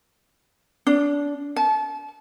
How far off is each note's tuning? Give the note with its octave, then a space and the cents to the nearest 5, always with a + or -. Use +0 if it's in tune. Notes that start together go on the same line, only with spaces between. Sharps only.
D4 -30
A5 -30